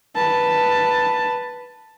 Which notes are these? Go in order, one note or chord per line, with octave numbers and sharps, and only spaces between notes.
B4 A5